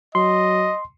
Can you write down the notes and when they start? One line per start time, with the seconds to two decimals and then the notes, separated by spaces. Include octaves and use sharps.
0.15 F#3 D#5 C6